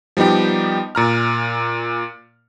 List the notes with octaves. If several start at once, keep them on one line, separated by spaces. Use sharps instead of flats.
F3 G3 B3 D#4 G4
A#2 A#5 F6